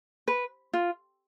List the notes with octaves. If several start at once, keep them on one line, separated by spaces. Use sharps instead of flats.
B4
F4